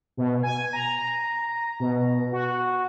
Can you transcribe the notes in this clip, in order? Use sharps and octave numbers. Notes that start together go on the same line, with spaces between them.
B2
G#5
A#5
B2
F#4